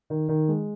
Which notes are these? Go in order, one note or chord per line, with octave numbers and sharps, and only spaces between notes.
D#3
D#3
G#3